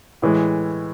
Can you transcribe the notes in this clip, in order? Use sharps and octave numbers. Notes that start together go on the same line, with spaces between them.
A2 E3 G#3